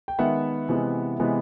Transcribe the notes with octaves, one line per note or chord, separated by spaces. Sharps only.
G5
D#3 G#3 B3 E5 F#5
C3 E3 G#3 B3
C3 E3 G#3 B3